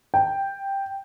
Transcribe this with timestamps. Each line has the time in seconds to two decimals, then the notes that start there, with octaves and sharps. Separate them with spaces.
0.14 G5